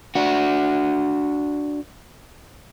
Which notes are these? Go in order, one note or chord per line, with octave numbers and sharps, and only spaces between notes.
D4 F#4